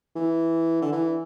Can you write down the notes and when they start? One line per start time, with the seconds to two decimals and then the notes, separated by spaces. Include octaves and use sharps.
0.16 E3
0.82 D3
0.93 E3